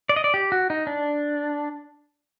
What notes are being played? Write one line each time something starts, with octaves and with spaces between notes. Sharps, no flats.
D5
D#5
D5
G4
F#4
D#4
D4